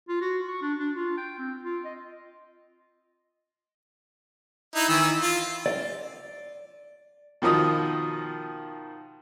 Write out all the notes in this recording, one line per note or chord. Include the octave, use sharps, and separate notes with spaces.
F4
F#4
C#6
D4
D4
F4
G5
C4
F4
D#5
D#4 E4
D#3 E3 E6
F4
D5
B2 D#3 F3 D#5 D#6